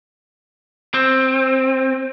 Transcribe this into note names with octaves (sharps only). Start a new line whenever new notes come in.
C4